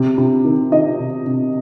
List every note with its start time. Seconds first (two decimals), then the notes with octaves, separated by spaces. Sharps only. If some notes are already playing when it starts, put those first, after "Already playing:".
Already playing: C3
0.18 C3
0.44 D#3
0.72 D#3 D#5
0.99 C3
1.26 C3